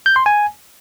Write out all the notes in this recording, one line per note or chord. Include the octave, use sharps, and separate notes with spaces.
G6
C6
G#5